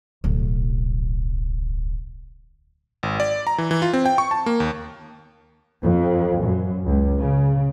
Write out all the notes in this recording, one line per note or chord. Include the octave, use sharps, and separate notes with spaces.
D1 B1
G#1
D5
A#5
E3
E3
F4
C4
G5
C#6
A5
A#3
D#2
F2
F#2
C#2
C#3